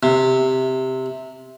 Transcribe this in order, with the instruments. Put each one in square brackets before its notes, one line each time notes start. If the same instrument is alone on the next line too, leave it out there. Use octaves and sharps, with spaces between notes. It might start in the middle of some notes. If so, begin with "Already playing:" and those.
[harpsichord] C3